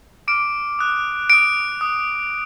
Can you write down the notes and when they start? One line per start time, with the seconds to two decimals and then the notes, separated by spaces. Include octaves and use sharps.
0.28 D6 F6 D7
0.79 D#6 F#6
1.30 D#6 F#6 D7
1.81 D#6 F#6